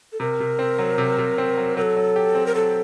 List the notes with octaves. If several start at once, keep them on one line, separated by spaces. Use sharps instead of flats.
A4
C3 A#4
C3
C4
F#3
C3
C3
C4
F#3
F#3 A4 A#4
F#3
G4
C4
A#4
F#3 A4